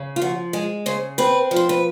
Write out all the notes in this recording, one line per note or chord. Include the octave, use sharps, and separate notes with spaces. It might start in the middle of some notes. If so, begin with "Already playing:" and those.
Already playing: C#3
F4
F3 F#4
G#3 G#4
C#3 C5
C4 B4
F3
C5
B4